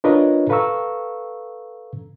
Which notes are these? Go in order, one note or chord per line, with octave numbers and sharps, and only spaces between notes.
D4 F4 A#4 B4 C#5 D#5
A4 B4 F5 A#5 C#6 E6